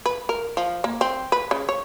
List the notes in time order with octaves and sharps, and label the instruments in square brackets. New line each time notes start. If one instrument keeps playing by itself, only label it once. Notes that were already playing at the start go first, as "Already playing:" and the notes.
[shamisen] B4
A#4
F3
A#3
C4
B4
C#3
C#5